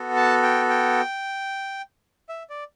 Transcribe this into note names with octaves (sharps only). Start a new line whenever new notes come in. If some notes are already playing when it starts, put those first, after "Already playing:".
Already playing: B3 F#4 A4
A5
G5
G5
E5
D5